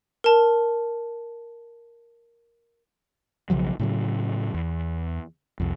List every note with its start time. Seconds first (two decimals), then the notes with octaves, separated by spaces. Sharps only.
0.24 A#4 A5
3.50 B1 C#3 F3 F#3
3.79 A2 C#3 F#3
4.54 E2
5.60 C2 F2